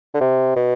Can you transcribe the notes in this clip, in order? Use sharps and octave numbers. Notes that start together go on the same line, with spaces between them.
D3
C3
B2